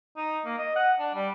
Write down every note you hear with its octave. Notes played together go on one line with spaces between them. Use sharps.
D#4
A#3
D#5
F#5
D4
G3